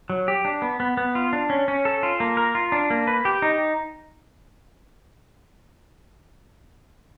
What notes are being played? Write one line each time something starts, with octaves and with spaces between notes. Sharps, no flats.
F#3
G4
D4
B3
B3
B3
F4
D4
C#4
C#4
A4
F4
A#3
A#4
F4
D4
A#3
B4
G4
D#4